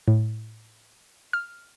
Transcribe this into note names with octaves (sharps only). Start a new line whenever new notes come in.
A2
F6